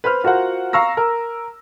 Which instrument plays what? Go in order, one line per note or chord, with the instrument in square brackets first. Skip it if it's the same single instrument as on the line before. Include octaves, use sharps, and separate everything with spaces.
[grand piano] B4 C5 F6
F4 F#4 A#4 C5 F#5
F5 A#5 C#6 E6 A#6
A#4